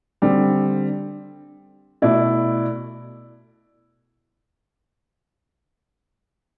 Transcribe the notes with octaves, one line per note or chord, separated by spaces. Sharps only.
D3 G3 C4
B2 A3 E4 A4 D5